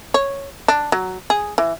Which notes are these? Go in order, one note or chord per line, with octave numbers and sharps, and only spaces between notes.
C#5
D4
F#3
G#4
E3